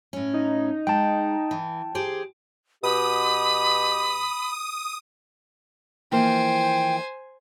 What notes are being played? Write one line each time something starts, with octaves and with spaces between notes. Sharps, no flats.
A2 C#4
D#4
G#3 G5 A5
E3
G4 G#4 C5
B2 G4 B5 D#6
E3 F3 A#3 C5 G5 G#5